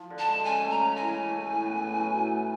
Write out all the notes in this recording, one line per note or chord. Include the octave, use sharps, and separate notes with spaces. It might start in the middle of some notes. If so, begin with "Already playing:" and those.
Already playing: F3
D3
A5
G#3
C#3 G#5
A3
A#5
C#3
E3 G#5
C#3
A3
A2
B3
A2
F#3
A2
B3